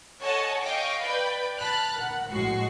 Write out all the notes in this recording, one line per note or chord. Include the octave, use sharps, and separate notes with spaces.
A4 C#5 D#5 F#5 G#5 A5
D#5 F5 G5 C#6 D6
B4 D5 G5 B5 G6
A5 B5 F6 F#6 A6
A#4 F#5
A#1 A2 G#3 F#4 C#6 C7